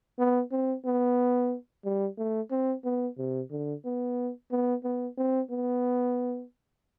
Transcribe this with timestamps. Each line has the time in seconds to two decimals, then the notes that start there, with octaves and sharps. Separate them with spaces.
0.19 B3
0.52 C4
0.85 B3
1.85 G3
2.18 A3
2.51 C4
2.84 B3
3.18 C3
3.51 D3
3.85 B3
4.51 B3
4.84 B3
5.18 C4
5.51 B3